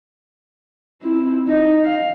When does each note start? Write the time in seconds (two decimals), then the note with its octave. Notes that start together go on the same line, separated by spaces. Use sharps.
1.01 C4 E4
1.47 D#4 D#5
1.84 F5